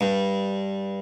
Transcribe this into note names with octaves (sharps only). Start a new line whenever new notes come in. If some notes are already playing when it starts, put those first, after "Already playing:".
G2